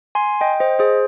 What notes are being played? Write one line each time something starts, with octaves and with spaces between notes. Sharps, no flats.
G#5 C6
D#5 G5
C5 D#5
G#4 C5